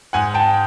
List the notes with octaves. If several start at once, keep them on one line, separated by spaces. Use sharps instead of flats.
G#2 F#5 G#5
G5 A5